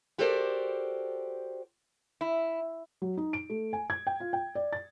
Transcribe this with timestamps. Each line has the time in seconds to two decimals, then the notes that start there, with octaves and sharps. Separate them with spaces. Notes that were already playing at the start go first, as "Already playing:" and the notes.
0.18 F#4 G4 A4 A#4 C5 D5
2.21 E4
3.02 F#3
3.17 D#4
3.33 D7
3.50 A3
3.73 G#5
3.90 G#6
4.07 G5
4.20 F4
4.33 G5
4.55 D5
4.73 A6